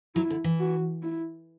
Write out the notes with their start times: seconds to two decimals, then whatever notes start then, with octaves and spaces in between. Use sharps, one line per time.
0.15 F#3 E4
0.30 D3
0.44 E3
0.59 F#4
1.02 E4